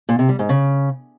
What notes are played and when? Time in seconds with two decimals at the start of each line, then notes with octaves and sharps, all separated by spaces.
0.09 A#2
0.19 C3
0.29 G3
0.39 G#2
0.49 C#3